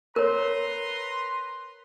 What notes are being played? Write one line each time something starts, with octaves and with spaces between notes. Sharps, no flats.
A#4 B4 C#5 A#5 C6